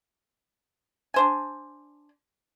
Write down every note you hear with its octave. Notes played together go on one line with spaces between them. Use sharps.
D4 C5 G#5